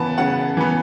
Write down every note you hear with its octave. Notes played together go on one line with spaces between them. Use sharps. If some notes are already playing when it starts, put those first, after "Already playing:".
Already playing: C#3 E3 B3 A5
C#3 F#5
E3 B3